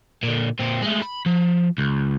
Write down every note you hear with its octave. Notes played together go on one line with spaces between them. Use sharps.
A#2 D3
A#2 C4
G#3 A3
B5
F3
C#2